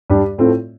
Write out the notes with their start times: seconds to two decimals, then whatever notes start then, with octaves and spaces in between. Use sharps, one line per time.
0.10 G2 G3 D4 G4
0.38 A2 A3 C4 F4 A4